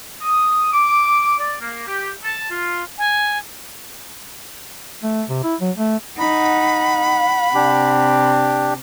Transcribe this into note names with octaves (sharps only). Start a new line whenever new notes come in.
D#6
D6
D5
A#3
G4
A5
F4
G#5
A3
C3
E4
F#3
A3
D#4 F#5 B5
C3 D4 G4